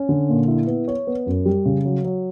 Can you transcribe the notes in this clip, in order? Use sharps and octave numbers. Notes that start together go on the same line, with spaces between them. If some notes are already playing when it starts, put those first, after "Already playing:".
Already playing: C#4
D3
A#2
E4
B3
C#5
B3
F#2
G3
C#3
F#3
F#3